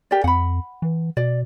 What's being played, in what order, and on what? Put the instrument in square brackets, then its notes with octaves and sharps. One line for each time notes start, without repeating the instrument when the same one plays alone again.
[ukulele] G4 A#4 D5
[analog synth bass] F2 [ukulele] F#5 B5
[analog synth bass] E3
[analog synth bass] B2 [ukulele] D5